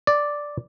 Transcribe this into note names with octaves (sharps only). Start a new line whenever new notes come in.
D5